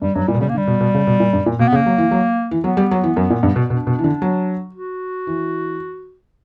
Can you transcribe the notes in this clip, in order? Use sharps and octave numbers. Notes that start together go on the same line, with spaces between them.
G2 G3
G2 F#3
A#2 G3
B2
C#3 G3
A#3
D3
G3
B2
B2
C#3
B2
A#2
G2
A#2
B2 A#3
B3
C#3
A#3
F#3
E3
F#3
E3
F#3 B3
G3
F#3
E3
F#2
A#2
G2
B2
B2 D4
B2
E3
D3
F#3
F#4
E3